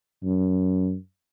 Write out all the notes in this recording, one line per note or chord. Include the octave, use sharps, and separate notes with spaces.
F#2